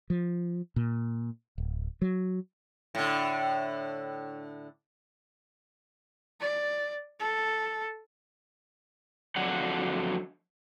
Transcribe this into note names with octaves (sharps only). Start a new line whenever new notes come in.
F3
A#2
D1
F#3
A2 D3
D5
A4
F2 D3 F#3 F#5